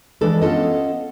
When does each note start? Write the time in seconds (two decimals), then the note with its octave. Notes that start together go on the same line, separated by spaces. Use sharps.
0.21 E3 G#3 D4 A4 B4
0.42 B3 C#4 F4 A4 D#5